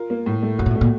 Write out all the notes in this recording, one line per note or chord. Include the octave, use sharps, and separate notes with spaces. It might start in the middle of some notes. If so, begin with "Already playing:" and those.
Already playing: F4 A#4
A#3
A2
A3
F#2 F#4
A#2
A2
A3
A#2